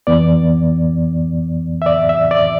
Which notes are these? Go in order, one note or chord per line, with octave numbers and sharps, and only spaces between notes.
F2 E3 B3 D5
E5
D5
E5
D5